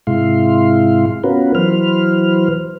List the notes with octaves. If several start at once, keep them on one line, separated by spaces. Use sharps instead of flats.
G#2 C3 G#3 E4 F5 C6
B3 C#4 F4 F#4 A#4 B4
E3 F#3 B4 C5 F6